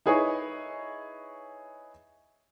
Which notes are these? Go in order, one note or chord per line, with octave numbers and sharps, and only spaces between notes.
D#4 E4 G#4 B4 C#5